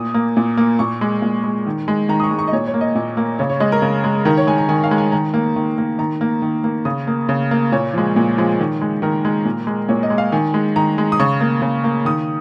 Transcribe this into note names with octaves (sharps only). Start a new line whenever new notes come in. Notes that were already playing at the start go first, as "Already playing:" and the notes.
Already playing: A#2 D#6
A#3
A#2
A#3
A#2 C#6
G#3
A#2
G#3
D#3
G#3
D#3 A#5
D#6
C#6
G#3
C#6
D#5
A#2 C#5
C#5
A#3
D#5
A#2
A#3
C#3 C#5
C#5
G#3 D#5
A#4
C#3
G#3
D#3 A#4
C#5
G#3 G#5
A#5
D#3 G#5
F5
G#3
G#5
D#3 A#5
A#3
D#3
A#3
D#3 A#5
A#3
D#3
A#3
C#3 D#6
A#3
C#3
A#3
A#2 C#5
F3 G#3
A#2
F3 G#3
D#3
G#3
D#3 A#4
G#3
A#2
G#3
A#2 C#5
D#5
G#3
F5
D#3 G#5
G#3
D#3 A#5
G#3
D#6
C#3 C#6
A#3
C#3
A#3
D#3 D#6